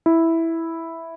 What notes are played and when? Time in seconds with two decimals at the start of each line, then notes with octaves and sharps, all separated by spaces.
0.06 E4